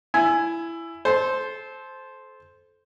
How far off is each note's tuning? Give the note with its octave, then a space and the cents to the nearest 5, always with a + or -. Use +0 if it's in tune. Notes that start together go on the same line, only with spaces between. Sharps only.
E4 +15 G#5 +0
A4 -25 C5 +0